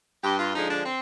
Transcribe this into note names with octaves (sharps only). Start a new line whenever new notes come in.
G2 G4
F4
D3 F3 G#3 D#4
D4
C4